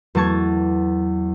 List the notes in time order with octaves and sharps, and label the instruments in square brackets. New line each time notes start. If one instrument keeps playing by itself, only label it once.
[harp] E2 F#3 A3 A5 C#6 G#6